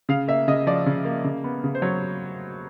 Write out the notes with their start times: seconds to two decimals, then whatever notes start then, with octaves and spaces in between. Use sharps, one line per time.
0.09 C#3 F5
0.28 A#3 E5
0.48 C#3 D#5
0.67 F3 D5
0.86 C#3
1.05 A#3
1.24 C#3
1.44 B3
1.64 C#3
1.75 C5
1.82 F#3 C#5